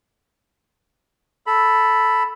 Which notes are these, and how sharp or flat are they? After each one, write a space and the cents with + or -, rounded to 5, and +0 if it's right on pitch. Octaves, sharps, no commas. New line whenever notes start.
A4 +0 B5 +0